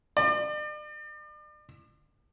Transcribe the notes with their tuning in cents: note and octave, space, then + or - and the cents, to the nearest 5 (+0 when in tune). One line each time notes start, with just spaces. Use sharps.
D5 +40